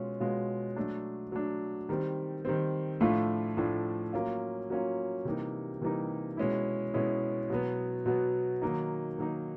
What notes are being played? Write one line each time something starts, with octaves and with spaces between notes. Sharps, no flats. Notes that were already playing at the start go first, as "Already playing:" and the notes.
Already playing: B2 G#3 C#4 F4
B2 G#3 C#4 F4
F#3 A3 D4
F#3 A3 D4
D#3 G3 C4
D#3 G3 C4
A2 F3 A3 D4 F4
A2 F3 A3 D4 F4
F#3 A#3 C#4 F4
F#3 A#3 C#4 F4
C3 E3 G3 A#3 D#4
C3 E3 G3 A#3 D#4
B2 G#3 C#4 E4
B2 G#3 C#4 E4
B2 F#3 B3
B2 F#3 B3
D#3 F#3 A#3 D#4
D#3 F#3 A#3 D#4